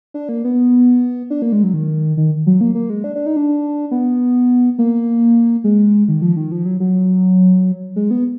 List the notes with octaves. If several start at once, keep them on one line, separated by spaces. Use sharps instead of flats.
D4
A#3
B3
D4
A#3
G#3
F#3
D#3
D#3
F#3
A#3
A#3
G#3
D4
D4
D#4
D4
B3
A#3
G#3
D#3
F3
D#3
F3
F#3
F#3
G#3
B3